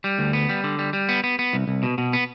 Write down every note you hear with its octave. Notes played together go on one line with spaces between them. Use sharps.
G3
D2
B3
G3
D3
G3
G3
B3
B3
B3
C2
C2
B2
B2
B3